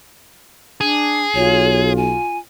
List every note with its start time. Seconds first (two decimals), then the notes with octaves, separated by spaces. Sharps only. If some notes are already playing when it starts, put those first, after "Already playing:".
0.81 D4 G#4
1.35 B1 F4 C#5
1.96 G#5